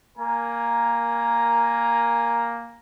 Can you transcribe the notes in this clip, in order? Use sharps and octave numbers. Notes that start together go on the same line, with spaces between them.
A#3 A#4 G#5 A#5